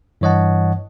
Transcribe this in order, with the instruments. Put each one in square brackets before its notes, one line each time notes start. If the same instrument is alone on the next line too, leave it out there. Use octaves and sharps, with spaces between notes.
[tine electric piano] G2 E3 C#5 D#5 F#5 A5